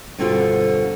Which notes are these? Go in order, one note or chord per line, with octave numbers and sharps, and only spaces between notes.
G2 B2 D3 C4 F4 F#4